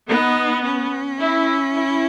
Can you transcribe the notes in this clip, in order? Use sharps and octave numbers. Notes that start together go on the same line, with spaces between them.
B3 D#4
C#4
E4
E4